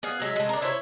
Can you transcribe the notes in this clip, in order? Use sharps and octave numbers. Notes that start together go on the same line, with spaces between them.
B3 G#4 F5
F#3 G#3 E5
G#3 A3
D4 A#4
E4 C5 C#5